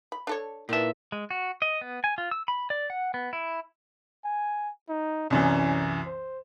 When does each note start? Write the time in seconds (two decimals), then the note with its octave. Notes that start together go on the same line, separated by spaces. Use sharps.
0.12 B5
0.27 D4 A4 C#5
0.69 A#2 D#3 D4 E4 A#4 B4 E5
1.12 G#3
1.31 F#4
1.62 D#5
1.81 B3
2.04 G#5
2.18 F4
2.31 E6
2.48 B5
2.70 D5
2.90 F#5
3.14 B3
3.33 E4
4.25 G#5
4.89 D#4
5.30 C2 F#2 E3 C#4
6.06 C5